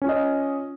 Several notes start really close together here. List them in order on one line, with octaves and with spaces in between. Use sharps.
C#4 F4 D#5